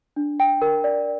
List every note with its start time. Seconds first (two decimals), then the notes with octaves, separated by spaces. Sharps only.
0.16 D4
0.40 G5
0.62 A#4
0.84 D5